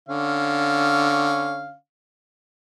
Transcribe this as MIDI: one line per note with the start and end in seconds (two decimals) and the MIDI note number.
0.09 1.74 50
0.09 1.74 61
0.09 1.74 77